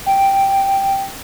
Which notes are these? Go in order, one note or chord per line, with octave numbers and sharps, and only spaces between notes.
G5